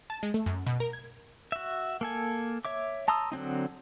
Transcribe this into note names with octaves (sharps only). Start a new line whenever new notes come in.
A5
G#3
A3
F#2
B2
A#4
G#6
F#4 E5
A#3 A4 G#5
C#5 E5 D6
A5 A#5 C6 D#6 E6
D3 F#3 C4 D#4